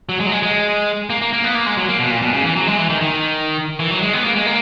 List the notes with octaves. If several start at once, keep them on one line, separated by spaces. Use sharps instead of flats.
F#3
G#3
F#3
G#3
G#3
A#3
A#3
A#3
B3
A#3
G#3
F#3
A#3
B2
A#2
B2
C#3
E3
F#3
G#3
E3
D#3
D#3
E3
F#3
G#3
B3
A#3
G#3
A#3